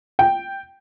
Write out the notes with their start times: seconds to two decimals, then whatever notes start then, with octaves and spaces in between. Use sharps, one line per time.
0.19 G5